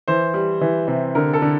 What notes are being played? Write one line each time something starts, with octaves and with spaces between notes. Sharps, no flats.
E3 C5
G3
E3
C3
D3 A#4
A4
D3